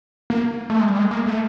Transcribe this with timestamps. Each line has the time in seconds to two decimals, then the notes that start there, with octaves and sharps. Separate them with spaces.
0.30 A#3
0.70 A3
0.80 G#3
0.89 G3
0.99 G#3
1.11 A#3
1.26 A3